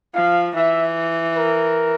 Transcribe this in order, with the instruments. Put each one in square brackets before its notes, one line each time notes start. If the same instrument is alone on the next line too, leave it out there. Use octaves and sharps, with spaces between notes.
[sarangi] F3 [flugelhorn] F5
[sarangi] E3 [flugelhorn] E5
[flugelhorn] A#4